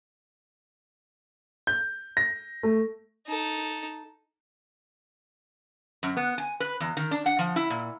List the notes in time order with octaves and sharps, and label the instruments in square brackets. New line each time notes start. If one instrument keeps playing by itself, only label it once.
[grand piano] G6
A#6
A3
[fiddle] D#4 A4
[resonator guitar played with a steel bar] F#2
B3
G#5
B4
E2
D#3
D4
F#5
F3
E4
A#2